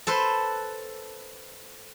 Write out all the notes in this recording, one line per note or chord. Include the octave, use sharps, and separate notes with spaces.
A4 B4 C5 C6